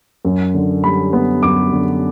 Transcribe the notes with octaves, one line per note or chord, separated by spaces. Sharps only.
F#2
D3
G3 B5
B3
F#2 D6
D3